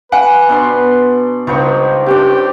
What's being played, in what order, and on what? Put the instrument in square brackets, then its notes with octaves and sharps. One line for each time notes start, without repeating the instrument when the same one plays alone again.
[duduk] B4 [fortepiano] F#5 [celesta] G#5
[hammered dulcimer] B2 D4 C6
[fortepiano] C#2 [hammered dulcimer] G2 C5 C#6 [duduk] D#4
[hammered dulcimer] C3 C#4 D4 [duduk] G4